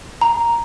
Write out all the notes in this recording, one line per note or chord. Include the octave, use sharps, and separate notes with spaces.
A#5